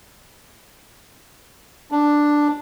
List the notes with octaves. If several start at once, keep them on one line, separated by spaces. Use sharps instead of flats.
D4